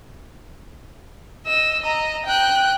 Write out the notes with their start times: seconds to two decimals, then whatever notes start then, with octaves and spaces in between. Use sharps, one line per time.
1.46 D#5 E6
1.82 D#5 A#5
2.26 G5 F#6